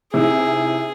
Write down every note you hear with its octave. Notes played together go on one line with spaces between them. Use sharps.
C3 E3 D#4 G#4